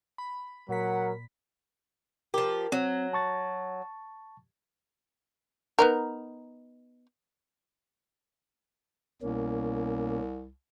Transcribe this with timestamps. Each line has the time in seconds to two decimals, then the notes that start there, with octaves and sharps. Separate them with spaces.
0.18 B5
0.69 A#2 F#3 A#4 F#5 B6
2.34 F3 G4 A#4
2.72 F#3 C4
3.13 A5 C#6 A6
5.79 B3 D#4 A#4
9.22 C2 B2 A#3 C#4